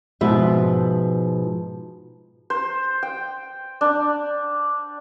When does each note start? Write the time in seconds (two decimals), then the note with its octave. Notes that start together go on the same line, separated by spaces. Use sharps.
0.21 G#2 B2 F3 B4 E5
2.50 C5
3.03 G5
3.81 D4